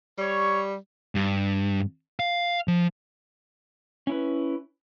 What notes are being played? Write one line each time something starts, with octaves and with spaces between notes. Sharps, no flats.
G3 C#5
G2
F5
F3
C#4 E4 B4